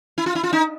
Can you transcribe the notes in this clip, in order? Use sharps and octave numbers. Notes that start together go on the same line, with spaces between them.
E4
F4
E4
F4
D#4